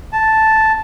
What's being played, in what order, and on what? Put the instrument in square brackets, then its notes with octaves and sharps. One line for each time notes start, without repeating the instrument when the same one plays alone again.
[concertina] A5